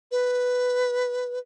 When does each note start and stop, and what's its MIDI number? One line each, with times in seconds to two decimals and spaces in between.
0.12 1.39 71